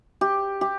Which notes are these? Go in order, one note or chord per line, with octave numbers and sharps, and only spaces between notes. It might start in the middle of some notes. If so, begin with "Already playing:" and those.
G4
G4